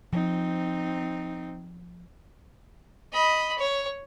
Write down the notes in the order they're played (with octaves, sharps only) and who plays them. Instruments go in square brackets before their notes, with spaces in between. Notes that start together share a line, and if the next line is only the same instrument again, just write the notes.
[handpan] F3 [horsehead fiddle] C4 D#4
[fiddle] D#5 B5
C#5